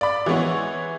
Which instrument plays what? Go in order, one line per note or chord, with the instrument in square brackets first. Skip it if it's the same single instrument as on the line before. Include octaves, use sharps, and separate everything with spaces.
[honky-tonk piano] D5 B5
E3 G#3 B3 C#5